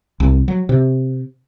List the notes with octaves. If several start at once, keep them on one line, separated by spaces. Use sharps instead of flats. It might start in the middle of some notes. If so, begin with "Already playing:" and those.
C2
F#3
C3